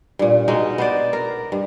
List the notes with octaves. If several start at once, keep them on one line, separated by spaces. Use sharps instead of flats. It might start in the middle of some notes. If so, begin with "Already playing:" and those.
G2 A#2
B2 G#3 D#4
B3 C5 D5
A#4
G2